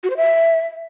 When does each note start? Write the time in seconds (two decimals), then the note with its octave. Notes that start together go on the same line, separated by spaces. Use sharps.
0.04 F#4
0.10 C5
0.17 E5